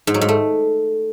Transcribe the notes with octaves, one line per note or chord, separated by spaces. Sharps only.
G#2
F#3
G#2
A3